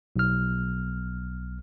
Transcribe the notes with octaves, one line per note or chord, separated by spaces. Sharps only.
B1 F6